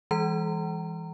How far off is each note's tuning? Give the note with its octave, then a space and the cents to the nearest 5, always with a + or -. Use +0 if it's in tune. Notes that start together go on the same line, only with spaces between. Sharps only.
E3 +0 G#3 -35 A#5 -20